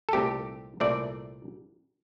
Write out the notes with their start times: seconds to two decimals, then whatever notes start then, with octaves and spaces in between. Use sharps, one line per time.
0.09 A4
0.13 C2 A#2 A3 C4 G4
0.80 C2 A#2 A3 C4 D5